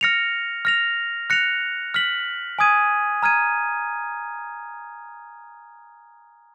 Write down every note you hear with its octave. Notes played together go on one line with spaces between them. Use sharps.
F6 A#6 C#7 F7
F6 A#6 F7
F#6 A#6 C#7 F7
F6 B6 F#7
G#5 D#6 G#6 D#7
A#5 F6 G#6 D#7